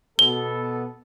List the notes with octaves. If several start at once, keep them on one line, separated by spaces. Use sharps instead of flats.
B2 B3 A4 G7